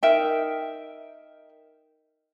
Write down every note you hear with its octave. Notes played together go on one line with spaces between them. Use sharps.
D#4 A#4 E5 G5